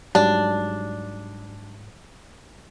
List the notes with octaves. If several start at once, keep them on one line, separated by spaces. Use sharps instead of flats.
G#2 F#3 G3 D4